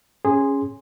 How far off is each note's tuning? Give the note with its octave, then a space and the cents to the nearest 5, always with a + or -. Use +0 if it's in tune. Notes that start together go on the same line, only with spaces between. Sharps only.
C#4 +0 G#4 -15 C6 +0